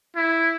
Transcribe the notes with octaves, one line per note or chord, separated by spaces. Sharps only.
E4